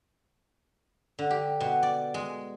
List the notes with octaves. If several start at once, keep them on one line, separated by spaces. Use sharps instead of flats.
D3
G4
B2
D5
G#3